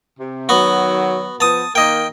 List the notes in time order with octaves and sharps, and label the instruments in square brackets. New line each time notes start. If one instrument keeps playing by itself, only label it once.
[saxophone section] C3
[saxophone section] D#3 F#3 [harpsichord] B3 F#4
[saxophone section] F3 B3 [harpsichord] A5 D#6
[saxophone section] D#3 A#3 [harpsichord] D#5 G5